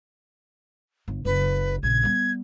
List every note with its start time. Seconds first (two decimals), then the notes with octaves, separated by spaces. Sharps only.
1.08 G1
1.25 F#1 B4
1.83 A#1 C#3 G#6
2.03 G3 B3